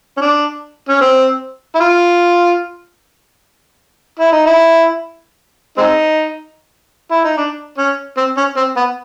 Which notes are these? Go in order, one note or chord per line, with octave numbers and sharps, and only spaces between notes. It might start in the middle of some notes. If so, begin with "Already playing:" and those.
C#4
D4
C#4
C4
E4
F4
E4
D#4
E4
G#3 C4 D#4
E4
D#4
D4
C#4
C4
C#4
C4
B3